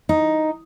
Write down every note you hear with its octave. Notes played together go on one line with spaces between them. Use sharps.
D#4